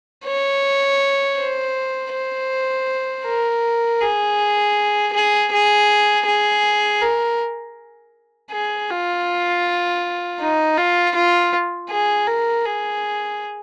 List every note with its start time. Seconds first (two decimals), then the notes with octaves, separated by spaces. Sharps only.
0.25 C#5
1.38 C5
2.13 C5
3.25 A#4
4.02 G#4
5.13 G#4
5.52 G#4
6.26 G#4
7.02 A#4
8.51 G#4
8.90 F4
10.40 D#4
10.77 F4
11.15 F4
11.89 G#4
12.27 A#4
12.65 G#4